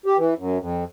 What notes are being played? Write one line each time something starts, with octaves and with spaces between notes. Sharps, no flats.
G4
E3
F#2
F2